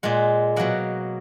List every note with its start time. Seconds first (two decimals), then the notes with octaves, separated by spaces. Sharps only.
0.03 A#2 G#3 F#5
0.56 B2 F#3 A#3 F#5